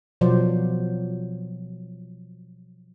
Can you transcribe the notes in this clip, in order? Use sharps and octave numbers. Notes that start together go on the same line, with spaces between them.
B2 F3 F#3 C5 D5